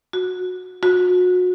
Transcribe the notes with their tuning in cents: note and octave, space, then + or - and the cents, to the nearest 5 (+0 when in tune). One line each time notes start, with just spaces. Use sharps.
F#4 -20
F#4 -35